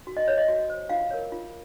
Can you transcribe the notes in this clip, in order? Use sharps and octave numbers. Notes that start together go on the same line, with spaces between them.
F#4
D#5
C5 C#5
D#5
F#4
C5
F4 F5
A#4 C#5
F4